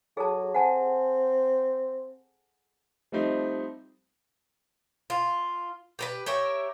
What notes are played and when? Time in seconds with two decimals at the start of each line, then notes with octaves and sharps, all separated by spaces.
0.17 F#3 G#4 A4 A5
0.54 C4 F#5 G#5 A5
3.12 F3 G3 A3 C4 D#4
5.10 F4
5.99 G4 A#4 B4
6.26 G4 A#4 C#5 E5